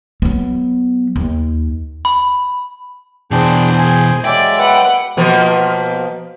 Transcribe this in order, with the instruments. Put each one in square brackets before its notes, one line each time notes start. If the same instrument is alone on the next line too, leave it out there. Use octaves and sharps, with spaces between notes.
[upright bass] F#3 B3
D#2
[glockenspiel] B5
[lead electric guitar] B2 E3 [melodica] D4 G#4 [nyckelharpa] C5 G5
[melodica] G#4 G#5
[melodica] F#3 G#3 E5 [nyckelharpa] D5 [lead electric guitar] G5
[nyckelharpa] B4 F#5
[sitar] B2 F3 A#3